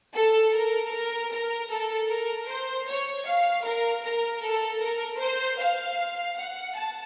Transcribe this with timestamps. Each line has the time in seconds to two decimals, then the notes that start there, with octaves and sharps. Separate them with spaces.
0.15 A4
0.54 A#4
0.92 A#4
1.31 A#4
1.71 A4
2.10 A#4
2.48 C5
2.87 C#5
3.26 F5
3.64 A#4
4.04 A#4
4.42 A4
4.81 A#4
5.20 C5
5.59 F5
6.37 F#5
6.76 A5